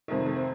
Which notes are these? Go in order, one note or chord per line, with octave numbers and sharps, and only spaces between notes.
F2 C3 D#3 A3
A3
C4